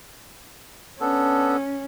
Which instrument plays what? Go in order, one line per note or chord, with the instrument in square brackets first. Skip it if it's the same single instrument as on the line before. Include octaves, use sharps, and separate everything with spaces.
[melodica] B3 D4 A4 [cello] C#4